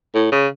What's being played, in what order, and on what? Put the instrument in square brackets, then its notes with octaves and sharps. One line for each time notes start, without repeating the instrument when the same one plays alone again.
[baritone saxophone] A2
C#3